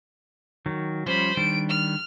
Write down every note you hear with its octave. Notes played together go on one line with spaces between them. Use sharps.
D#3 F#3
F3 G3 C#4 C5 B5
D#3 G3 D4 D7
F6